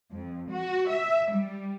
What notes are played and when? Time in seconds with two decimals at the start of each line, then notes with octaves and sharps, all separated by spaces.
0.11 F2
0.50 F#4
0.90 E5
1.33 G3